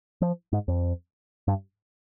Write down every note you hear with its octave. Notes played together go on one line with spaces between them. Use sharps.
F3
G#2
F2
G2